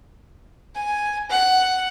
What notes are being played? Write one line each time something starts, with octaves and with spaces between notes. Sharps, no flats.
G#5
F#5